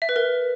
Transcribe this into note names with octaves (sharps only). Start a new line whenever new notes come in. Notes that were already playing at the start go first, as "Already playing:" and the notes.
E5
B4
A#4